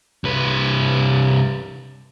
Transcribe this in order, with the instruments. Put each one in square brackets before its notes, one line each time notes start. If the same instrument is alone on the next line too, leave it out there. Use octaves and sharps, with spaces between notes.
[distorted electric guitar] C2 B4